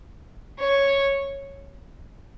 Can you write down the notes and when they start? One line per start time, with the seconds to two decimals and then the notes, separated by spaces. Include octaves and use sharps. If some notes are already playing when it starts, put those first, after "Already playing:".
0.60 C#5